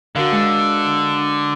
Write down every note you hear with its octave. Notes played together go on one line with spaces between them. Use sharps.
D3 F#4 A#4 F5
G#3